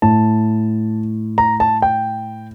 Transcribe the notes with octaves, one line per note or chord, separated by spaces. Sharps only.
A2 A5
A#5
A5
G5